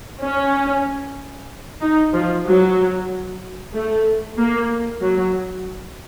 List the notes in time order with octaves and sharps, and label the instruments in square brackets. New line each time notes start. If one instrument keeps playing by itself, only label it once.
[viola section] C#4
D#4
F3
F#3
A3
A#3
F#3